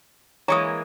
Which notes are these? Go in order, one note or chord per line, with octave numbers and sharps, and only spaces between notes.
E3 G#3 A#3 C#5 A#5 C#6 D#6